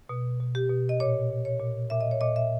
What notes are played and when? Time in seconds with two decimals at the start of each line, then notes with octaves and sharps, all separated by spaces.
0.09 B2
0.40 B2
0.55 G4
0.69 B2
0.89 D#5
1.00 A#2 C#5
1.30 A#2
1.45 C#5
1.60 A#2
1.90 A#2 E5
2.01 D#5
2.11 C#5
2.21 A#2 D#5
2.36 E5